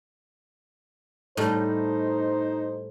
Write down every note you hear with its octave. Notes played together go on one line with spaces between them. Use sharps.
A2 G3 D#4 C5